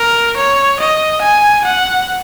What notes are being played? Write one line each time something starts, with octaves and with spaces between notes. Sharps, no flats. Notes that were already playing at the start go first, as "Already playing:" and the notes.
Already playing: A#4
C#5
D#5
G#5
F#5